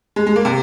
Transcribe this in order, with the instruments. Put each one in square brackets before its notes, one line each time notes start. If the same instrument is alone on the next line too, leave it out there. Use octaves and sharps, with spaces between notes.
[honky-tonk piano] G#3
G#3
A#3
C3